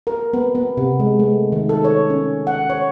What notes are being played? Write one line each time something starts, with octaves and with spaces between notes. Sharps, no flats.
A#4
B3
B3
C3
G#3
A3
D#3
A4
C#5
C#4
F#5
C#5